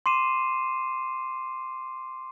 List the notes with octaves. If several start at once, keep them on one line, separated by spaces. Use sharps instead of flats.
C6 D6 C7 D#7 E7